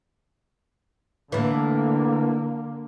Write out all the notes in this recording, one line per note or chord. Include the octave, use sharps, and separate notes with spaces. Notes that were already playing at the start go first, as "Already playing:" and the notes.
A2 D3 E3 A#3